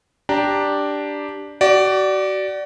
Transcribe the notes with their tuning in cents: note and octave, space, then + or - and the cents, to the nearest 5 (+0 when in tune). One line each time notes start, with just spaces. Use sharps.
D4 +0 G4 +0 A#5 +0
F#4 +35 D5 +0